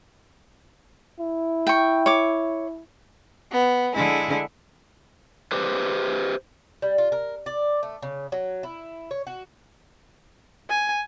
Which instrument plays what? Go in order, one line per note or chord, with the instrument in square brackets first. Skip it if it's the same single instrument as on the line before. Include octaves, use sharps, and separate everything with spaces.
[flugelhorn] E4
[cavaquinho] G5 C#6
C#5 D6
[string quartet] B3
D3 G#3 E4
[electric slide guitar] G4 B4 C5
[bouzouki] G3
F4
A#4
D5
A3
C#3
F#3
E4
C#5
F#4
[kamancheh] G#5